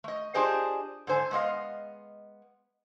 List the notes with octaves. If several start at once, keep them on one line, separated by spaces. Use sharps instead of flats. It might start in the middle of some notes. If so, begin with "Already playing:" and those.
A3 D#5
D4 F4 G4 G#4 C5 D#5
G#2 D3 C5 G#5
G#3 B3 D#5 F5